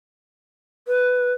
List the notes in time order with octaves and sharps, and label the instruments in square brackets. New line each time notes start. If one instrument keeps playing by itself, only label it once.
[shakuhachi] B4